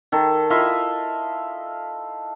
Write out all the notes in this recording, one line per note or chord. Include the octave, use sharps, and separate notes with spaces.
D#3 A4
E4 F4 D#5 E5